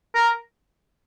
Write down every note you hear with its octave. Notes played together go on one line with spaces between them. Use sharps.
A#4